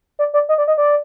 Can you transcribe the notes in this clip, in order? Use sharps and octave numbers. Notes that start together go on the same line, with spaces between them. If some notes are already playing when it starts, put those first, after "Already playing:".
D5
D5
D#5
D5
D#5
D5